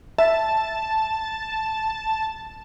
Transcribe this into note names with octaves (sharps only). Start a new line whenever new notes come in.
E5 A5